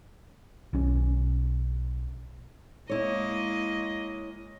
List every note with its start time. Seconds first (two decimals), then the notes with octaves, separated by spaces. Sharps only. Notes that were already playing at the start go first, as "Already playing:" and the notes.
0.73 B1 C#4
2.89 G#3 A#3 E4 C#5 D#5